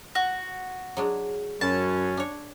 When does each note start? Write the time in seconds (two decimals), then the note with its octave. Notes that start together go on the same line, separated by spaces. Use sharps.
0.15 F#4
0.97 F#3 G#3 D4
1.61 F#2 C#4 A5
2.17 D4 C#5